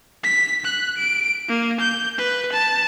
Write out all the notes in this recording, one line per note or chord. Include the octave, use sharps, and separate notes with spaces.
B6
F#6
D7
A#3
G6
B4
A5